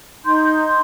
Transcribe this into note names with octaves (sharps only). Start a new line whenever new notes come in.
D#4 C6 G6